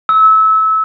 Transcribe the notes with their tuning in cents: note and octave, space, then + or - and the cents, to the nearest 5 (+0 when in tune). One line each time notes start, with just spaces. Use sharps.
E6 -25